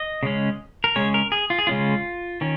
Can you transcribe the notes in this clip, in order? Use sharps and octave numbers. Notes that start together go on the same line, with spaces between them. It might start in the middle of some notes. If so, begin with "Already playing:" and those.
Already playing: D#5
C#3 G#3 C#4
A#4
C#3 G#3 C#4 C#5
A#4
G#4
F4
G#4
C#3 G#3 C#4 F4
D#3 C#4